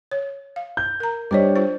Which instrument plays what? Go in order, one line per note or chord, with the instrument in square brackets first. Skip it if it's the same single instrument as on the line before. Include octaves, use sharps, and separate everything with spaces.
[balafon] C#5
F5
[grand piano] G6
[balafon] A#4 A#5
[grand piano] G3 D4 C#5 [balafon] G4 C5 D#5
[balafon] F4 C5